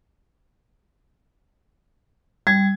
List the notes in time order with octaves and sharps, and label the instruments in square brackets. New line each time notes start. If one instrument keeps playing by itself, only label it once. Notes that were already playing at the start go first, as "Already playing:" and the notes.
[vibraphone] G3 [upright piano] G#6